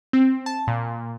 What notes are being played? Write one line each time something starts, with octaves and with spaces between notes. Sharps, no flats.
C4
A5
A#2